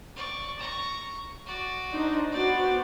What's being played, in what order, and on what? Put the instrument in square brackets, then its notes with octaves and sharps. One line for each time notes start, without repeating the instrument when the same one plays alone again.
[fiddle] D5 C#6
A#5 C#6
F#4 D5
[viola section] D4 D#4 C5
[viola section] B3 F#4 C5 [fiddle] D5 D6